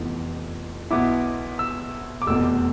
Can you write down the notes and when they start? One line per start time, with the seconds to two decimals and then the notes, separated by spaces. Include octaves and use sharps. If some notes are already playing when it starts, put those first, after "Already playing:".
Already playing: F1 F2 E3 B3
0.91 B1 B2 B3 E4 D6
1.59 E6
2.22 D6
2.27 F1 E2 B2 A3 E6